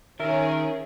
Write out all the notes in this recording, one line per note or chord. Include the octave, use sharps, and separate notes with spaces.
D#3 C#4 G#4 A#4 E5